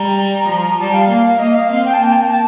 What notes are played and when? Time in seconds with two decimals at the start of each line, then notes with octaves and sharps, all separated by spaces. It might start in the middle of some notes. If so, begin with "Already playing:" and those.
Already playing: G3 A#5
0.48 F3
0.79 G3 A5
0.94 F5
1.09 A#3 F5
1.39 A#3 D#5
1.54 F5
1.70 C4 F5
1.85 G5
1.94 A5
2.00 A#3 G5
2.13 A5
2.21 G5
2.30 A5